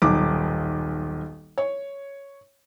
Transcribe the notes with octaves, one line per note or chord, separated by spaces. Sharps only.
D#1 B1 D6
C#5